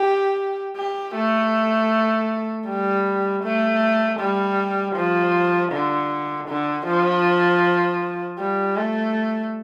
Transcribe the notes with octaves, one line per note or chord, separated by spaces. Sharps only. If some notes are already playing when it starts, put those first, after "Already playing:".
Already playing: G4
G4
A3
G3
A3
G3
F3
D3
D3
F3
G3
A3